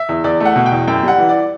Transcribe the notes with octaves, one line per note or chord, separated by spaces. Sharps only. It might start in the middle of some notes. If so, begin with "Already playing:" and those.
Already playing: E5
E2
E2 D5
A3 F#5
B2
G5
E2
F#2 G5
G3 F#5
E3
D5